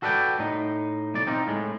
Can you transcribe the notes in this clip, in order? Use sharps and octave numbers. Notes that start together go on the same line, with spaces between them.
F#4 A4 B4 D5 F5 G5
A2 D#4
B1 A2 D5
C4 D#4 F4
A2 G#3